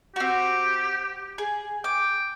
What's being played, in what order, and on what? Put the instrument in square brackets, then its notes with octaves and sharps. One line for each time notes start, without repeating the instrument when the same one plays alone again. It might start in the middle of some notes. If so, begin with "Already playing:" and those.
[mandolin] C4 F#4 [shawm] G4
[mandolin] G#4
[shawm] G5 [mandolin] D6